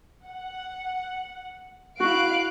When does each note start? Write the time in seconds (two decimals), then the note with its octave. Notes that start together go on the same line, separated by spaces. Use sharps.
0.24 F#5
2.00 E4 F#4 F5 F#6 D7